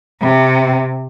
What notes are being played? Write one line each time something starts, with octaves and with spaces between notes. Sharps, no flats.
C3